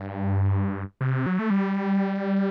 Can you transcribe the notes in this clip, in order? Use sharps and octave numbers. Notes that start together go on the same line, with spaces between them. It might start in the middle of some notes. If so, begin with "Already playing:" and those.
Already playing: G2
C3
F#3
A3
G3